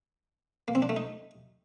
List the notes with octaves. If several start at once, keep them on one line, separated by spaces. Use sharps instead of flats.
A#3
C4
D4
A3
D#4